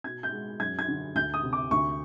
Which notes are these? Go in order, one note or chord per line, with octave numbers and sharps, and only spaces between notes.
B2 G#6
G6
G#3
F#2 G#6
G#6
D3
D2 G6
D#6
C3
D6
D2 C#6